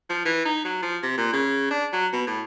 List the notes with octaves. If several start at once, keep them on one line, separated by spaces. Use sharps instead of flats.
F3
E3
D#4
F#3
F3
C3
A#2
C#3
D4
F#3
B2
A2